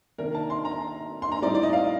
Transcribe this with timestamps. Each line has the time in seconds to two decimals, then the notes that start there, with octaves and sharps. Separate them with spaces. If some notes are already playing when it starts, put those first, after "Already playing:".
0.18 C3 D#3 A#3 D4 A#4
0.35 A5
0.50 C6
0.65 A#5
1.22 C6
1.32 A#5
1.42 A2 G3 C4 D#4 D5
1.55 D5
1.63 D#5
1.73 F5